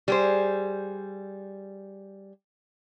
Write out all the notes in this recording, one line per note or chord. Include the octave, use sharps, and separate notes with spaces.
G3 G#4 C5